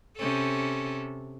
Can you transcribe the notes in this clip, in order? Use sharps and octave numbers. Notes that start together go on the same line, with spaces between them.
C3 C#4 A4